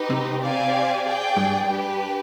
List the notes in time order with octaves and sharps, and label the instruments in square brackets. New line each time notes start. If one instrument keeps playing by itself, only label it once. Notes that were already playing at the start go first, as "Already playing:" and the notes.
Already playing: [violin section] D#4 G4 B4
[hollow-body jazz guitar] C3
[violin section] C4 G4 D5 F5 G#5
G#4 D5 G5
[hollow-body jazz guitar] G2
[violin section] D4 G4 B4